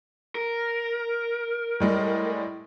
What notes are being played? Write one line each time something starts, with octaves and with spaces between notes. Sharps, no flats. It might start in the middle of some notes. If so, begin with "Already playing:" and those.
A#4
A2 G3 G#3